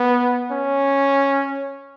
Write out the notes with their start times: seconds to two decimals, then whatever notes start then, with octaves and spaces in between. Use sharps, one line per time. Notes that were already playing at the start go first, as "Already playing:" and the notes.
Already playing: B3
0.52 C#4